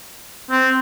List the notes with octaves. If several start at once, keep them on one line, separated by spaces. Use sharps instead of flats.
C4